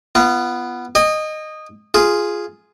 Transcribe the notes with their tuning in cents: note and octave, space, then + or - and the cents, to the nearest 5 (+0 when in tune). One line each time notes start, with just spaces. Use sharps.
B3 +0 F4 -30
D#5 -10 G#5 -45
F4 +0 G#4 +0